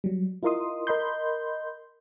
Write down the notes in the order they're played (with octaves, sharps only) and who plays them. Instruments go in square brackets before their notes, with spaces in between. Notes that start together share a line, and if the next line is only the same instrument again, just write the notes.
[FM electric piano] F#3 G3
E4 F4 A#4 D#5 C6 D#6
A#4 D#5 B5 C6 G6